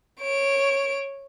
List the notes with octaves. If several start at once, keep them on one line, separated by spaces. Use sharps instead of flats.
C#5 D7